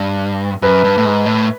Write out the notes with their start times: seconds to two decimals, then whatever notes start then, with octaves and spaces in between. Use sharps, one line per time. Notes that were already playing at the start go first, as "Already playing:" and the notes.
Already playing: G2
0.62 F#2 B4
0.84 G2
0.98 A2
1.05 G#2
1.26 A2